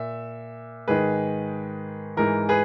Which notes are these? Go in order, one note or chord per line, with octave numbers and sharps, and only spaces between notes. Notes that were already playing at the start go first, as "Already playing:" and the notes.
Already playing: A#2 E5
G#2 D#3 G#4 B4
G#2 E3 A#4
G#4 B4